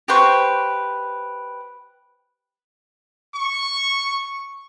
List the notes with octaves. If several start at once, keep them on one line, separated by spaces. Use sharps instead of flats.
G4 B4 C5 C#6
C#6